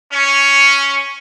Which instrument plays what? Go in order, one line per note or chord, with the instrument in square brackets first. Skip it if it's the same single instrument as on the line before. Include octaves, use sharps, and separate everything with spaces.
[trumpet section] C#4